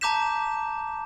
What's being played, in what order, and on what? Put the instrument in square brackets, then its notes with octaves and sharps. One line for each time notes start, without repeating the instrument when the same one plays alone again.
[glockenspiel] A5 A#5 D6 G6 B6 E7